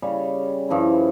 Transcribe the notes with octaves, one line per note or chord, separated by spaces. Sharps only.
C#3 G3 C#4
G2 F3 C#4 E4